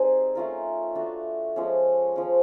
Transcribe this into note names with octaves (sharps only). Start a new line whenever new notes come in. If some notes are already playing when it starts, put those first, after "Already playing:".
Already playing: G3 C4 D#4 G#4
A3 C#4 F4 A#4
A3 D4 F#4
F3 G#3 C#4
F3 G#3 C#4